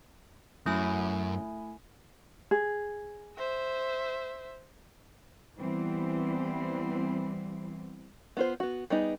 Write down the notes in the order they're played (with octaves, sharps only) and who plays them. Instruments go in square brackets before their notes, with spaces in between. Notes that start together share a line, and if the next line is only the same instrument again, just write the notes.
[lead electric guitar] F#2 [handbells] A3 E4 G#5
[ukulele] G#4
[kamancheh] C5 E5
[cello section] E3 G3 B3 C4
[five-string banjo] B3 F4 C5
B3 F#4
G3 B3 D#4 G#4